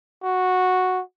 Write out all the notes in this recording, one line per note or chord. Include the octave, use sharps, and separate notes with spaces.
F#4